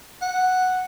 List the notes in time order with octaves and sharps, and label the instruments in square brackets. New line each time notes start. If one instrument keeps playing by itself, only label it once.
[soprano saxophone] F#5